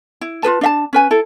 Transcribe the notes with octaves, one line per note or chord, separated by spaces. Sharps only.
E4
F4 G#4 B4 A5
D4 E5 A5
C#4 B4 G#5
E4 A4